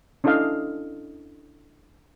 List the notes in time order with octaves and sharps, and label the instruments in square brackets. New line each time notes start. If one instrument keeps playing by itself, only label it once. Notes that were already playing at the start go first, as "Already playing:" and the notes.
[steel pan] C#4 D4 E4 A4 D#5 F5